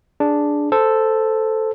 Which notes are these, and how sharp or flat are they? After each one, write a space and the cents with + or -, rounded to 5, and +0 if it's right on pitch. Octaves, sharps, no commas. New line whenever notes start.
D4 +0 G#4 +0
A4 +0 C5 -10